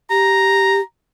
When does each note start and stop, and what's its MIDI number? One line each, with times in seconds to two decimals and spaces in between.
0.10 0.81 67
0.10 0.81 82